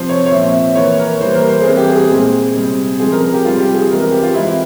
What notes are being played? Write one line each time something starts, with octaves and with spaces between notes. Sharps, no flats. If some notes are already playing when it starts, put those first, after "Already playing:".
Already playing: C3 F3 C4 C5
C#5
C#5
A#2 F3 C4 E5
E5
E3 A#3 C#5
A#4
E3 G3 A#3 C5
A#4
C5
G#4
E3 G3 C4 A#4
G4
G#4
G#4
A#2 G#3 C4
C3 G3 C4
C#3 F3 G#3 C4 G#4
A#4
A#4
G4
C3 G3 C4 F4
G4
G#4
E3 G#3 C4 A#4
A#4
G4
F4
E3 G#3 C4 E4